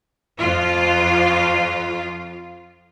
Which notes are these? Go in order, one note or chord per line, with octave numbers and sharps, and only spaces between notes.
F2 F4